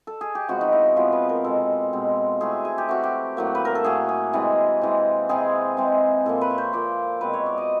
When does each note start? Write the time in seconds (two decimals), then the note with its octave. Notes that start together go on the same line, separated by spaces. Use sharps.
0.07 A4
0.21 G#4
0.35 G4
0.48 C3 F3 G#3 B3 F#4
0.61 D#4
0.73 E4
0.96 C3 F3 G#3 B3 F4
1.12 B4
1.29 A#4
1.44 B2 G#3 C4 A4
1.93 B2 G#3 C4
2.40 E3 A3 C4 G#4
2.65 G#4
2.78 G4
2.89 E3 A3 C4 F#4
3.03 G4
3.37 A2 F#3 A#3
3.55 B4
3.65 A#4
3.75 A4
3.84 A2 F#3 A#3 G#4
4.09 G#4
4.33 C3 E3 G#3
4.82 C3 E3 G#3
5.29 C3 E3 G#3 C4 G#4
5.77 C3 E3 G#3 C4
6.26 A#2 F3 A#3 A4
6.41 B4
6.50 C#5
6.58 C5
6.73 A#2 F3 A#3 D5
7.21 B2 G#3 C4 B4
7.33 C#5
7.46 D5
7.58 D#5